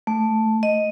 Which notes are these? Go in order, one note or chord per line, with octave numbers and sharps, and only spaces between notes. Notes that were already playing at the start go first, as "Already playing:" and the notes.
A3
D#5